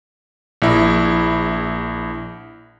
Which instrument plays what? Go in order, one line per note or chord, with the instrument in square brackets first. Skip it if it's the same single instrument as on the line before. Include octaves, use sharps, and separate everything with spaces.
[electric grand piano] A#1 E4